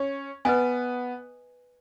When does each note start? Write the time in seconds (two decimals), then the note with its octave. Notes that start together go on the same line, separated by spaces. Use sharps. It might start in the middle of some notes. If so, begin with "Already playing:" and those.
Already playing: C#4
0.45 B3 B4 D#5 G#5